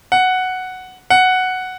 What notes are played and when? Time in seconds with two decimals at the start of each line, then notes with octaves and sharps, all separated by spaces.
0.12 F#5
1.10 F#5